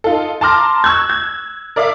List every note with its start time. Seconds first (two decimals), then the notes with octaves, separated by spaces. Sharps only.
0.04 D#4 F4 A4
0.41 A5 A#5 C6 D6 F6 A#6
0.84 C#6 E6 F#6 G#6
1.10 G#6
1.76 A#4 D5 E5 F5 D6